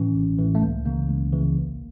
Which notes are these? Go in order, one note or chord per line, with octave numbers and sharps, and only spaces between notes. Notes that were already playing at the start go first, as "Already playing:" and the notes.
Already playing: A2 E3 C#4
A1
A2 E3
A3
C#2 A#3
C#3 E3 A#3
C#2
C#3 E3
A1